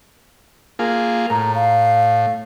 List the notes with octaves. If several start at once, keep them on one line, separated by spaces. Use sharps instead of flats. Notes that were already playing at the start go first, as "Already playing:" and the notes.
A#3 F4 G#4
A2 A#5
F5